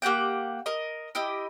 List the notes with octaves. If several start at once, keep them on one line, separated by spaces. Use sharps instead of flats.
A#3 G4 F#5 G5
A#4 D#5
E4 G4 D#5